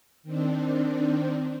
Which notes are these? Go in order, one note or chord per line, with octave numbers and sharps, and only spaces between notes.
D#3 C4 D4